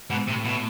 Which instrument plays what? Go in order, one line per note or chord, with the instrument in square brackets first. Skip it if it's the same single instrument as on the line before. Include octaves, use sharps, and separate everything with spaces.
[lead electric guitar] G#2 [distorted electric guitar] B2
[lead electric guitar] A2 [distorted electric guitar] C3
[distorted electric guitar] B2